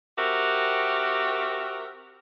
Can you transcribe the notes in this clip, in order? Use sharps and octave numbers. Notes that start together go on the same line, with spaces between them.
C4 F#4 G4 A#4 E5